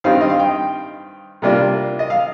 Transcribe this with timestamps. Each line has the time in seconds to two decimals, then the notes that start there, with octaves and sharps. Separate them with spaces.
0.04 G2 D#3 G3 C4 D#4 F5
0.21 D#5
0.30 F5
0.39 G5
1.42 C3 G3 A#3 D4 F4
1.99 D#5
2.10 F5